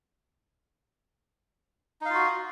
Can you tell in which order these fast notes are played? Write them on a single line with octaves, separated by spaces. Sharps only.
D#4 F5 F4 F#4